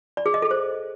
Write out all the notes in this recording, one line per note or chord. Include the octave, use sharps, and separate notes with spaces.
D5
G#4
D#5
A4
C5